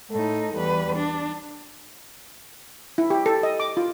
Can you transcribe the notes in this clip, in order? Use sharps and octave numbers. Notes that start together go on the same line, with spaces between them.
A2 D#4 A4
E2 G3 B4
D4
E4
G4
A4
D#5
D6
F4